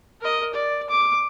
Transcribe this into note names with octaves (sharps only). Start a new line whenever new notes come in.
A#4 D#5
D5
D6